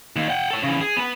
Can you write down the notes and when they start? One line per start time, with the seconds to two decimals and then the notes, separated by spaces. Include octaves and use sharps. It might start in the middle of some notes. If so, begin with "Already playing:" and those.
0.16 D#2
0.29 F#5 G5
0.50 A4 C#5
0.63 C#3 E3
0.80 G#4
0.97 B3 B4